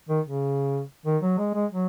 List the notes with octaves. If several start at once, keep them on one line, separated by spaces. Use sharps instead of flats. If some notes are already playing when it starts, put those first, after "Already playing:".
D#3
C#3
D#3
F#3
G#3
G#3
F#3